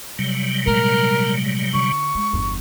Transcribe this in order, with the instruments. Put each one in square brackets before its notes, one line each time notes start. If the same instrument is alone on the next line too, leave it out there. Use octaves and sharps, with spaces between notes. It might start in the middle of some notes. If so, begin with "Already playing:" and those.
[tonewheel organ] C3 F#3 G3
[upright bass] A#2 G#3 [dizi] A#4
[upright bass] D3 [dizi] C#6
[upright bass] G#3
G1 E2